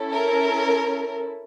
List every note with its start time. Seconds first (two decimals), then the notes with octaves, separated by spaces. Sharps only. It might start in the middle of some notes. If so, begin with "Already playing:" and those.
Already playing: C#4 E4 A4
0.12 A#4